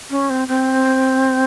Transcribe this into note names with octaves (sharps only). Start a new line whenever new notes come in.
C#4
C4
C4